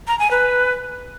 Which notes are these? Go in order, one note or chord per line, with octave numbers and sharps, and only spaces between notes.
A#5
G#5
B4